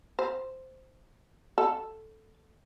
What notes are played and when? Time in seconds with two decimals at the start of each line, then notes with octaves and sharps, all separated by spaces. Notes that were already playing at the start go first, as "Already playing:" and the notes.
0.19 C5
1.58 A4